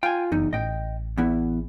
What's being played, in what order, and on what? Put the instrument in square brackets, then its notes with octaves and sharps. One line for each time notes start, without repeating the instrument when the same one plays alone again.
[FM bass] F4 [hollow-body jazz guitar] G5 G#5
[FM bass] F#1 [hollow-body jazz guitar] E2 D#4
[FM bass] A1 [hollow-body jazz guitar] D#5 G5
[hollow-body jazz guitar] E2 B3 E4